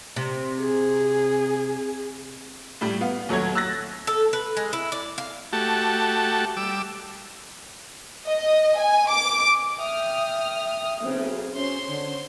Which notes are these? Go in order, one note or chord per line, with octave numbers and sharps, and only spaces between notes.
C3
G#4
A2 G3
B3 F5
D#2 F#3 A3 C#5 G#6
E6 F#6 A6 A#6
A4
B4
G#3
E4
D5
F5
A3 F#4 G4 A5
G3 D6 E6
D#5
G#5
D6
E5 G5 D#6 F6
B1 C#3 C4
C#4 C5 C#5 C6
D3